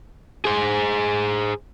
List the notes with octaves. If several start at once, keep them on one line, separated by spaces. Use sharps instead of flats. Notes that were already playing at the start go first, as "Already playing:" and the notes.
G#4 C5